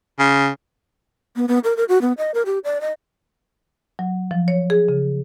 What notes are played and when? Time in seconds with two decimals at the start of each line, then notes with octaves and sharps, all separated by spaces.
0.19 C#3
1.36 B3
1.48 B3
1.64 A#4
1.77 A#4
1.89 F#4
2.01 B3
2.18 D#5
2.34 A#4
2.46 G4
2.64 D5
2.81 D#5
3.99 F#3
4.31 F3
4.48 C#5
4.70 G#4
4.89 C#3